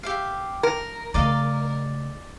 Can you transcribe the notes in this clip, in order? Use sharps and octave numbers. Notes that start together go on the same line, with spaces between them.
G4 E5 F5
A#4
C#3 A3 D5 D#5 F5